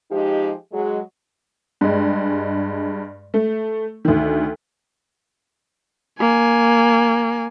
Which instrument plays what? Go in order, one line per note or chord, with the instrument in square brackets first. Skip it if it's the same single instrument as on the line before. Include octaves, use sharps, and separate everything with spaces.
[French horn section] F3 G#3 D#4 G4
F#3 G#3
[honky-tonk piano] G2 G#3
A3
D2 D#3
[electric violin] A#3 G#5